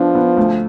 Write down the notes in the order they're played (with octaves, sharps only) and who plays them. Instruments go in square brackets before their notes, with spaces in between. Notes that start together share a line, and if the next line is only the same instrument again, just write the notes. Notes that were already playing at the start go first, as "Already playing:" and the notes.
Already playing: [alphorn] F3 [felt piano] B3 D4
[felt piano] B3
D2